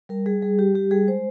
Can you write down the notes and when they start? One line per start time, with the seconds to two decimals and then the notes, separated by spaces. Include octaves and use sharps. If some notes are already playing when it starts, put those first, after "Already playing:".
0.09 G3 A#4
0.26 G3 G#4
0.42 G3 G#4
0.59 G3 G4
0.74 G3 G4
0.91 G3 G#4
1.08 G#3 C5